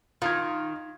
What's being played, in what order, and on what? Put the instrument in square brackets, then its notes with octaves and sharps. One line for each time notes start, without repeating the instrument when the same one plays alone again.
[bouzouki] D#3 [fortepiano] F4 [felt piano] C6 F6 G#6